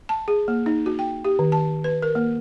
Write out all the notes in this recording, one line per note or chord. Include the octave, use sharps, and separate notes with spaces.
A5
G#4
A#3
D#4
F#4
G5
G4
D#3
A5
B4
A#4
A#3